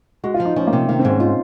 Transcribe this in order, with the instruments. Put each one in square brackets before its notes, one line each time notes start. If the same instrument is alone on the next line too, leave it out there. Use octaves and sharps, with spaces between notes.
[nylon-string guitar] G#3 [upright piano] F#4
[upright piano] F4
[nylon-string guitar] F3
[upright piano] D#4
[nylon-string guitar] F3 [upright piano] C#4
[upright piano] A#3
[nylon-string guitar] C3
[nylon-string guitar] D#3 [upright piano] A#3
[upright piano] C4
[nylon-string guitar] G#2 [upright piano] C#4
[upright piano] D#4 [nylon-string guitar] F4